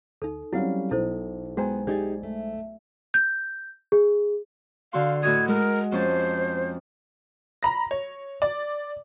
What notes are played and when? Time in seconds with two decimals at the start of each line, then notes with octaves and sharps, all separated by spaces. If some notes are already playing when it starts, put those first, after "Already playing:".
0.22 D2 D#4 A4
0.53 F#3 G3 C4 C#4 E4 F5 F#5
0.91 B1 B2 E4 A4 C5
1.57 G#3 B3 F#4 C5 G5 G#5 A#5
1.87 D#4 G4 G#4 D5 D#5
2.23 A3
3.14 G6
3.92 G#4
4.93 D3 F#4 F5 C6
5.23 A2 F#4 D#5 G#6
5.48 G#3 A#4
5.92 F2 C#4 C5 A5
7.63 A#5 B5 A#6
7.91 C#5
8.42 D5